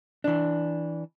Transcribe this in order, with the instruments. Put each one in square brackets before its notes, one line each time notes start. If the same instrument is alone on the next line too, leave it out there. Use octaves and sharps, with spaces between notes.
[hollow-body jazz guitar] E3 D4